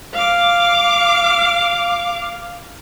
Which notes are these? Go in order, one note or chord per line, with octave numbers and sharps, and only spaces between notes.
F5 D6